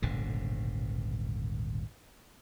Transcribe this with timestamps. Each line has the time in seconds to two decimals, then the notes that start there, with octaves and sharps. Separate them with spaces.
0.02 D#1 G#1 B2 D3